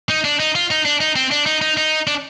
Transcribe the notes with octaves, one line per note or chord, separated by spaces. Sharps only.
D#4
D4
D#4
F4
D#4
D4
D#4
C4
D4
D#4
D#4
D#4
D4